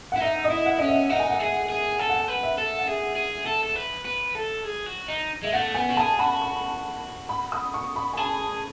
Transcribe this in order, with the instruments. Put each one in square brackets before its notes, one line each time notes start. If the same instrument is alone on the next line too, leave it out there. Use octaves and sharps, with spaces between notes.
[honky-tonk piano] F#5
[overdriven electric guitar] E4
[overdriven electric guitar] D#4 [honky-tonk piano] E5
[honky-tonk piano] D#5
[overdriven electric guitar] E4
[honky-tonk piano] F#5
[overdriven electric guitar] C#4 [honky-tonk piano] D#5
[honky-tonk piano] E5
[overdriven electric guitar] D#4 [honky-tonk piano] F#5
[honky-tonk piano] G#5
F#5
[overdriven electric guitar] G#4
G#4
[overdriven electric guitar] A4 [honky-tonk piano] G#5
[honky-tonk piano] F#5
G#5
[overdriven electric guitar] B4
[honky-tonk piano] E5
[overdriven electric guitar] A4
[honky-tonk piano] F#5
[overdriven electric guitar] G#4 [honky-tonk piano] E5
[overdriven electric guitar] G#4
A4
A4
B4
B4
A4
G#4
F#4
D#4
[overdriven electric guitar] G#3 [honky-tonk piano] E5
[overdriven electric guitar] A3 [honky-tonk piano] F#5
[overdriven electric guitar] B3 [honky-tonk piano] G#5
[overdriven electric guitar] F#4
[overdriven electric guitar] G#4 [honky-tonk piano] A5
[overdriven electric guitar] F#4 [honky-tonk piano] B5
[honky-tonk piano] C#6
B5
D#6
C#6
B5
G#5
[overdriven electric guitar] G#4 [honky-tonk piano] A5